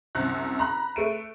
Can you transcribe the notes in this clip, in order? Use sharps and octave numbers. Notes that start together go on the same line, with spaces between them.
C2 F#2 C3 F#6
A#5 B5 F#6
A3 D7 D#7